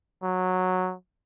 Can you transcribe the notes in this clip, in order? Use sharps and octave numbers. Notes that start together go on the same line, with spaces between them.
F#3